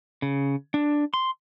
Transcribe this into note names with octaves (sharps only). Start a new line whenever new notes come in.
C#3
D4
C6